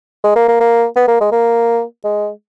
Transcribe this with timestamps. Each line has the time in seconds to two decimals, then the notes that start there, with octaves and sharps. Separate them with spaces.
0.24 G#3
0.36 A#3
0.49 A#3
0.60 A#3
0.96 B3
1.08 A#3
1.21 G#3
1.32 A#3
2.04 G#3